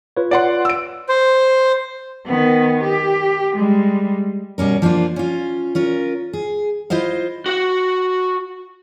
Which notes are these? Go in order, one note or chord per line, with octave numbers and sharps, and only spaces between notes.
F4 B4 C#5
D5 F#5 C6
E6 D7
C5
D#3 B3
G4
G3 G#3
B2 G3 C#4 A#4
F3 A#3 C4 D4 F4
C#4 F4
C#4 F4 A#4
G#4
E4 F4 C5 D#5 F5
F#4 F#5